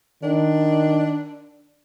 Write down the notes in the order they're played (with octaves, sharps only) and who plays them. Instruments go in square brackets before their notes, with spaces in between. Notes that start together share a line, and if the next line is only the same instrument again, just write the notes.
[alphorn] D#3 [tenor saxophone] D4